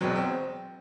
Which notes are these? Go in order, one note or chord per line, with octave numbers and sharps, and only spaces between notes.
E1 E2 B2 F#3 C4
C4